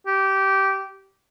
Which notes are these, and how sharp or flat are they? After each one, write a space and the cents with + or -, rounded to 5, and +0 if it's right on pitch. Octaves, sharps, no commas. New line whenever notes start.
G4 -15